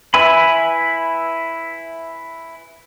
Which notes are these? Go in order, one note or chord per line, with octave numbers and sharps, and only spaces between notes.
E4 B4 E5 G#5 B5